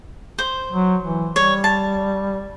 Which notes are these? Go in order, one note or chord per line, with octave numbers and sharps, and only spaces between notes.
C5
F#3
E3
G3 C#5
A5